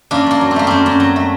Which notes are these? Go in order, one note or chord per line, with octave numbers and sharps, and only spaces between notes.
F#2 A#3 D4
F#2 A#3
F#3
C4
A3 A#3
F#2 C4
F#2
F#3
A3